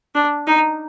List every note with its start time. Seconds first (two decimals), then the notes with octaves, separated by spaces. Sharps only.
0.15 D4
0.47 D#4